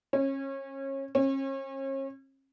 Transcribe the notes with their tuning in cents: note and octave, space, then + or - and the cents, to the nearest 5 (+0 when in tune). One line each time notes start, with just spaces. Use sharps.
C#4 -30
C#4 -40